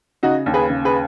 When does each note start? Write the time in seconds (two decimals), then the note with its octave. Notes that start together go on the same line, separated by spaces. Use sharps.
0.23 C#3 D#4 F#4
0.46 D#2
0.54 G#4 B4
0.70 C#3
0.85 G#4 B4